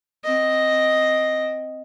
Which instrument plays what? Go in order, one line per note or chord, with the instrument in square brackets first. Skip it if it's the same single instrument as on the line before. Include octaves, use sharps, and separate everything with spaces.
[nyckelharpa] C4 D#5